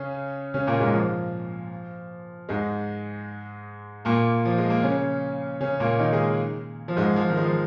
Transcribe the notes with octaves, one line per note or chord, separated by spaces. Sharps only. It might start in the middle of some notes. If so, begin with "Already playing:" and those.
Already playing: C#3 C#4
C#3 C#4
A#2 A#3
G#2 G#3
F3
G#2 G#3
A#2 A#3
F3
G#3
A#3
C#3 C#4
C#3 C#4
A#2 A#3
D#3 D#4
G#3 G#4
F3
G#2 G#3
F3
D#3
G#3
F3